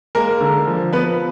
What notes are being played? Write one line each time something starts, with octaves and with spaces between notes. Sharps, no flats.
G#3 A#3 A#4
D3
F3
F3 B3 B4